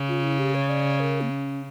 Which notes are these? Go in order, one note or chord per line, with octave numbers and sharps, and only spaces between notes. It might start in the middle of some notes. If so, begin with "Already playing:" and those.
Already playing: C#3
F4
E4
G4
C#5
D5
A#4
A#3
C#4